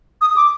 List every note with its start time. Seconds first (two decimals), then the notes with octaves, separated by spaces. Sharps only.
0.21 D#6
0.36 D6